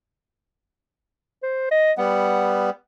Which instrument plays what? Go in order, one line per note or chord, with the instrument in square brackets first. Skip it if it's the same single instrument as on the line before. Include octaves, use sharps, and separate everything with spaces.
[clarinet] C5
D#5
[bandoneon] G3 B3 [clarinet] F#5